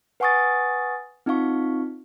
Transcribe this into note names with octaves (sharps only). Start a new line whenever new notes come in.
B4 F#5 G#5 C#6 D#6 A6
C4 D#4 F4 F5 C#6